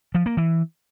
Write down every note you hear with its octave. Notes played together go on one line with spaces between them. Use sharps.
F3
A#3
E3